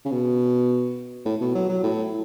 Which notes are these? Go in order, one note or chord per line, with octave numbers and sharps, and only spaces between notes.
C#3
B2
A2
B2
F#3
F#3
A2